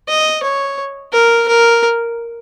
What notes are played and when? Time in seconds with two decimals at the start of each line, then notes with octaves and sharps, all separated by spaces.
0.08 D#5
0.43 C#5
1.13 A#4
1.48 A#4